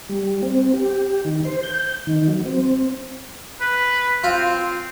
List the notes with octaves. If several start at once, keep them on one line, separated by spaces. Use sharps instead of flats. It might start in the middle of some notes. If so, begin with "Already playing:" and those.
G3
C4
G4
D#3
C5
G6
D#3
F#3
C4
B4
C4 F4